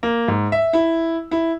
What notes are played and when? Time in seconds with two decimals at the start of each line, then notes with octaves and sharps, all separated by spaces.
0.03 A#3
0.28 G#2
0.52 E5
0.73 E4
1.31 E4